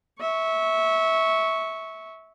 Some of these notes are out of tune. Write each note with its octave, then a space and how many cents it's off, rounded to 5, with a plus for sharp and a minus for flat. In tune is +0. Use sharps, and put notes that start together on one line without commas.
E5 -20 C#6 +0